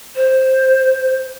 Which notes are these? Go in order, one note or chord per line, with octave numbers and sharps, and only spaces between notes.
C5